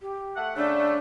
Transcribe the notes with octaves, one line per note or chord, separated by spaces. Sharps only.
G4
A3 F#5
C#3 A3 D4